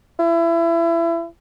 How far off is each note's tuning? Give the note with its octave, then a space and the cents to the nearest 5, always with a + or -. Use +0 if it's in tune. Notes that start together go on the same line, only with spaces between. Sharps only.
E4 +30